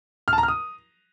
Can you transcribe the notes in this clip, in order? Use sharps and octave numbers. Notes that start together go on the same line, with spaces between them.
F6
A5
A#5
F6
D#6